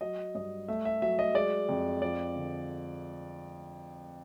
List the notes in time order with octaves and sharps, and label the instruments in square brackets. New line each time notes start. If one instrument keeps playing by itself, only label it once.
[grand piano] F#3 D#5
G2 D#5
A3 E5
E5
F#3 E5
D#5
G#3 D5
F2
F3 D5
D3